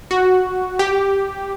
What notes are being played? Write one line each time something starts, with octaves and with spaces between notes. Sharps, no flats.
F#4
G4